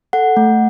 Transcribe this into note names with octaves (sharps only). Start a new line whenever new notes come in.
A4 F#5
A3